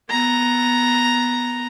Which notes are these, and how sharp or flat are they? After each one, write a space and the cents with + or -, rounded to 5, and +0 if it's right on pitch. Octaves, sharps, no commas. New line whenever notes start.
B3 +0 A#5 +0